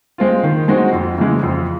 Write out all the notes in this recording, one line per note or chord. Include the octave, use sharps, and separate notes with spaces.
G#3 C4 F4
D#3
G#3 C4 D#4 F#4
F2
C#3 E3 G#3
F2